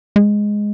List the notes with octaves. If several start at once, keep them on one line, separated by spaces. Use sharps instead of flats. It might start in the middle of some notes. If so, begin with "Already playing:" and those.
G#3